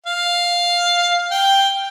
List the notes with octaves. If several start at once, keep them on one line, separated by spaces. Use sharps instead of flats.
F5
G5